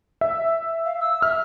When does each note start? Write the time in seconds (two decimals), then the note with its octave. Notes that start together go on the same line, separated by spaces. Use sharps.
0.21 E5
0.86 F5
1.00 E6
1.22 E5 F6